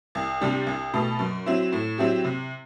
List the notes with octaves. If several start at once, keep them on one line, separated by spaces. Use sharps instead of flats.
C2
C3 G3 D4 G4
C2
B2 A3
F#2
F#3 C4 E4
A2
F#3 C4 E4 G4
C3